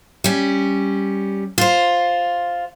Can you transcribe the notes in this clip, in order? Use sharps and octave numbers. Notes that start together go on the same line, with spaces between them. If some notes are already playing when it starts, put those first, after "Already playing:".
G3 C#4
F4 C5